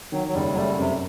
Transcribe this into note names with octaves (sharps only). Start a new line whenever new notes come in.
D#3 F#3
F#3
F#1 G3
F#3
G3 A3
F#2 C3